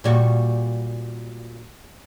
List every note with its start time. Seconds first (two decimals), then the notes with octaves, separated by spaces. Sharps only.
0.04 A#2 G3 F#4